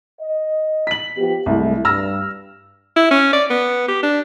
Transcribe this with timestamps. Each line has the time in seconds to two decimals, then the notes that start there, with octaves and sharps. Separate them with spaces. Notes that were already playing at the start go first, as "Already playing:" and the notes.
0.20 D#5
0.87 B6 F#7
1.17 F3 B3 G4
1.46 C2 G#3 A3 E4
1.85 G2 E6 F6 A#6
2.96 E4
3.11 C#4
3.33 D5
3.50 B3
3.88 G4
4.03 D4